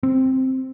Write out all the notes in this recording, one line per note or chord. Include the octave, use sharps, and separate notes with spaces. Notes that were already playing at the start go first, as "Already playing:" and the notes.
C4